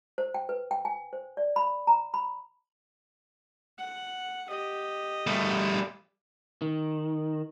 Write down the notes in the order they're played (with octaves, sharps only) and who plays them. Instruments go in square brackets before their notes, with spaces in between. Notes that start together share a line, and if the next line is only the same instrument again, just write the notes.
[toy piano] C5
G5
B4
G5
G#5
C5
D5
B5
A#5
B5
[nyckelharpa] F#5
G4 D#5
[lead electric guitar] G3 A3
[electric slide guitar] D#3